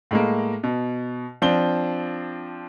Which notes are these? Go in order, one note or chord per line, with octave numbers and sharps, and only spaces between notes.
A2 G#3 A#3
B2
F3 C4 D4 G7